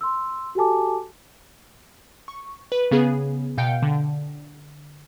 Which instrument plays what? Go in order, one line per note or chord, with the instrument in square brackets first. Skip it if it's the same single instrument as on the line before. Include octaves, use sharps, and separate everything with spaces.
[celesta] C6 E6
F#4 G4 A4 G#5 A5 D6
[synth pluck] C#6
B4
C#3 B3 G#4
B2 F5 G5 G6 C#7 D7
D3